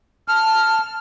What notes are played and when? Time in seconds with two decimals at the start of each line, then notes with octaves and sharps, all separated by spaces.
0.28 A5 F6